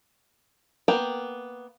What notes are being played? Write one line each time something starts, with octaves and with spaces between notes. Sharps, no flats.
A#3 B3 A#4 G5